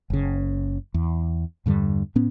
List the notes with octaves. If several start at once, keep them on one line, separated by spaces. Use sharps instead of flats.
F#1 C#3
E2
E2 G2 D3 G3
A2 B3 C#4